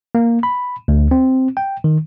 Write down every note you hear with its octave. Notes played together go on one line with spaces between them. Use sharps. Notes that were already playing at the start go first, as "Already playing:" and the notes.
A#3
B5
D2
C4
G5
D#3